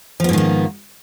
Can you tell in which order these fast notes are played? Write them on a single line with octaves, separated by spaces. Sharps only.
F3 B3 G#2 D#3 A#3